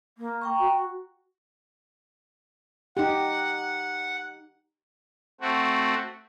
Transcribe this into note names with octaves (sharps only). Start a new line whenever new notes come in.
A#3
G5 A#5 C#6
F#4
D#4 G4 F#5
A3 C4 F#4